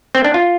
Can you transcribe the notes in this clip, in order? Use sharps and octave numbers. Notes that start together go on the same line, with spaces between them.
C4
D4
F4